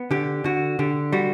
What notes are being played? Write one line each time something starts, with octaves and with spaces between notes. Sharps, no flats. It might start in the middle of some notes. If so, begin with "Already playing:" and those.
Already playing: B3
D3 G4
D3 F#4
D3 G4
G3 F#4